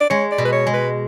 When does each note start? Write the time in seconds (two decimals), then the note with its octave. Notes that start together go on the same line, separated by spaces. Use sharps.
0.01 D5
0.10 G#3 C#5
0.32 D5
0.38 B2
0.45 B4
0.53 C#5
0.67 G#3
0.74 B4